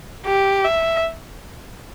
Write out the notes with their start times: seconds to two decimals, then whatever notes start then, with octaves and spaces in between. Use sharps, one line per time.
0.26 G4
0.64 E5